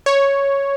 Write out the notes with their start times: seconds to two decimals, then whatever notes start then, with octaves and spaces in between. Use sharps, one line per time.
0.06 C#5